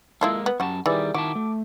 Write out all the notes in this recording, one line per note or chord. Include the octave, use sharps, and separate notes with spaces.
G#3 A#3 E4 F4 A4
B3
F#2 G3 F#4 A5
D#3 E3 G3 G#4 D5 E5
D#3 E4 F#4 A5 D6
A3